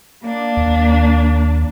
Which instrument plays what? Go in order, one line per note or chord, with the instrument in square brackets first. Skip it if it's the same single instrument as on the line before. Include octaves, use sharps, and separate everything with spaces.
[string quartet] A#3 D4
[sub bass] D#2